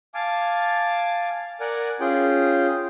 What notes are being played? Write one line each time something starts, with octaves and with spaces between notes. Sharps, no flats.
F5 G#5 A5 D6
A#4 D5 F#5 G#5
C#4 F4 G#4 G5